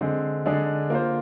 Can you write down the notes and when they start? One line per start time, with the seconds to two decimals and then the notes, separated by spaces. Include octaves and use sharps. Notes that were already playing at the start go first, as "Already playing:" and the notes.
0.01 D3 G#3 C4
0.46 D3 G#3 D4 G#4
0.90 A#3 F4 C5